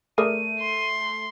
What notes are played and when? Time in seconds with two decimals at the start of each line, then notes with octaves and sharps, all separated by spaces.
0.18 A3 G#4 A#4 D5 D#7
0.60 C6